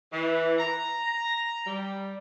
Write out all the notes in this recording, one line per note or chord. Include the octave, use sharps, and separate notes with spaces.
E3
A#5
G3